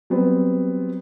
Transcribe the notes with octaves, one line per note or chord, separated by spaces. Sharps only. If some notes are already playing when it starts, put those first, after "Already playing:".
F#3 G3 B3 C4